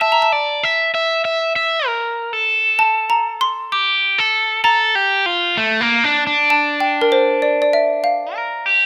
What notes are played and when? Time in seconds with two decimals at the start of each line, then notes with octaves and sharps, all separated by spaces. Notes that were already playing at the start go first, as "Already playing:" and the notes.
0.01 E5 A5
0.12 A#5
0.22 A5
0.32 D5
0.63 E5
0.94 E5
1.25 E5
1.56 E5
1.86 A#4
2.33 A4
2.79 A5
3.10 A#5
3.41 C6
3.72 G4 D6
4.18 A4
4.64 A4 A#5
4.95 G4
5.26 F4
5.57 A3
5.81 A#3
6.04 D4
6.27 D4
6.50 A5
6.80 G5
7.01 A#4
7.12 C5
7.42 D5
7.62 D5
7.73 E5
8.04 F5
8.35 A#4
8.66 G4